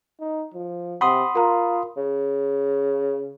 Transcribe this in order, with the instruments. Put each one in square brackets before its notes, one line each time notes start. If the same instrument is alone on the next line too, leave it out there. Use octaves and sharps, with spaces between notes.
[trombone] D#4
F3
[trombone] C3 [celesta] F#5 [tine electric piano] B5 C6 D#6
[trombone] F4 [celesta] A#4 A#5
[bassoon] C#3